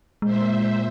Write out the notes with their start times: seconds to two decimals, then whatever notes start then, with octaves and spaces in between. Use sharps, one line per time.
0.22 A#2 G#3 C5 E5